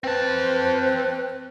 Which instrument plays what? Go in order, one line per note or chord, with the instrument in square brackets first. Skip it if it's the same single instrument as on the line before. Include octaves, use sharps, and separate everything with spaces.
[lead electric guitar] C4 A5 [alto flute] B4 [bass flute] C5